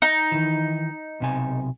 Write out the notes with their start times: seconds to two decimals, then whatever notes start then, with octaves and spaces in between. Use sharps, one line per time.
0.02 D#4
0.32 D#3 E3
1.20 B1 C3 G#5